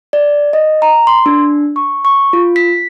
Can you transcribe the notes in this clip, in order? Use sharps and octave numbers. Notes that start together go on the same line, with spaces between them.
D5
D#5
A#5
C6
D4
C#6
C#6
F4
B6